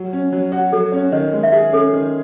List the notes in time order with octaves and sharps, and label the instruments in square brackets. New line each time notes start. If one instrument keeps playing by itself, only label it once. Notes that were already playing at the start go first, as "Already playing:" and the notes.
Already playing: [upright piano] F#3
C#4
F#3
[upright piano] F#4 [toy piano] C#5
[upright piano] F#3 [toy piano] A4
[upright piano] C#4 [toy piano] C#5
[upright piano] D#3 [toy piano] D#5
[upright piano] G#3
[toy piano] E5
[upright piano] G#4
[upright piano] C#4 [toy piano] A4
[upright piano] D#3